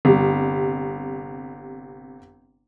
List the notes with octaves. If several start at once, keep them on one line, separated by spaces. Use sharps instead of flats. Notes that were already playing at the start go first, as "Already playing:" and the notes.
G1 C3 G3